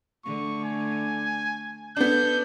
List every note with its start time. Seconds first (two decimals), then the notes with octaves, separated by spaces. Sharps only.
0.25 D3 A3 C#6
0.64 G#5
1.97 B3 D4 A4 G6